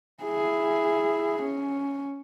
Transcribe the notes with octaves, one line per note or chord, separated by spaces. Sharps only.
E4 G#4
C#4